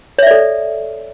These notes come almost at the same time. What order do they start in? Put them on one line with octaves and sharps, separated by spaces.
C#5 E5 D5 A4